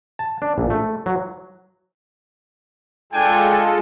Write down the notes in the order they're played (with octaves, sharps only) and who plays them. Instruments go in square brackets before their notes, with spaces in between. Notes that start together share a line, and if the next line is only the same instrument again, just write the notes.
[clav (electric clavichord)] A5
D4
A#1
A3
F#3
[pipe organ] G#3 F4 A4 [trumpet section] D4 G5 G#5